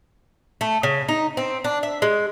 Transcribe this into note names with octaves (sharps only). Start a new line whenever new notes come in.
A3
C#3
D#4
C4
D4
E5
G#3